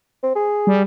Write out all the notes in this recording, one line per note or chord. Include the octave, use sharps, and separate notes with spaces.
C4
G#4
G3